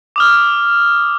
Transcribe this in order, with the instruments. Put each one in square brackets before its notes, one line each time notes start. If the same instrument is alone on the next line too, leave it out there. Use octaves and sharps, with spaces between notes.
[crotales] D6 D#6 F6